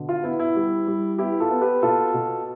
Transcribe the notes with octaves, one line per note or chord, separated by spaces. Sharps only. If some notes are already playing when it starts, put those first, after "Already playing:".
Already playing: B2 D3
F4
B3 E4
E4
G3
G3
B3 E4 G4
F4 A4
B3
G4 B4
B2 F4 A4
B2